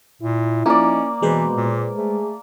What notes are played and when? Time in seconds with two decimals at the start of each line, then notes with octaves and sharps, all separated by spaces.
0.22 A#2 E4
0.66 F3 A#3 C#4 D#4 D5
1.22 B2 E3 G#3 B4 C5
1.56 A#2
1.97 A3 G#4